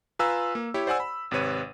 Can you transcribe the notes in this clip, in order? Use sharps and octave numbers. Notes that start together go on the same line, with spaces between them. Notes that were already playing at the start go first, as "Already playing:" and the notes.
F4 B4 F5 G#5 A#5 E6
A#3
E4 G4 C#5
C5 D5 F#5 G#5 E6
B5
G#1 C3 B4 C#5 D#7